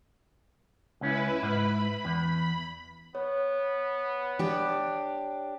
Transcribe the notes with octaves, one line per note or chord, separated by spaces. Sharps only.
C#2 C#4 E4 B4
G#2 B5
E2
B3 C#5
D4 G4